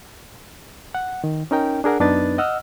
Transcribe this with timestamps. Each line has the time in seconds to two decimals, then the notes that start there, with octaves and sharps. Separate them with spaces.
0.95 F#5
1.24 D#3
1.51 C#4 D#4 A#4 G5
1.84 D4 G#4 A#4 F#5
2.00 F#2 B3 D4 D#4 B4 A6
2.38 D#5 F#5 E6 F6